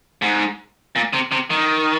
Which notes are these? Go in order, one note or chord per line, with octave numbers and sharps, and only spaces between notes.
G#2
A#2
C3
C3
D#3